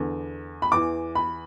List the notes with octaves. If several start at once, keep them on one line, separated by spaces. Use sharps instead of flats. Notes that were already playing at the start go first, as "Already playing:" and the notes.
Already playing: E2 D3
B5
E2 E3 D6
B5